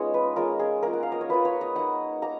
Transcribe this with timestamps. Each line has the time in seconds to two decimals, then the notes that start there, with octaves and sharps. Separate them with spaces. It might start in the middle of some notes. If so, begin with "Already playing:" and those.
Already playing: G#3 B3 C#4 D#4 F4 C#5 D#5
0.14 B4
0.36 G#3 C#4 F4 A#4
0.59 G#4
0.83 A#3 F4 A#4
0.93 F#5
1.03 F5
1.12 D#5
1.21 C#5
1.29 A#3 F4 B4
1.45 C#5
1.61 D#5
1.75 A#3 D#4 F#5
2.22 A#3 A#5